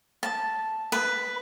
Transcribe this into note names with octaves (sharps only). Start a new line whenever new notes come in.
A5
B4